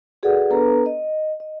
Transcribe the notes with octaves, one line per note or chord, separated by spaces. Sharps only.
F#4 G#4 A4 B4 D5 F#5
B3 D4 A4 B4 A#5
D#5
D#5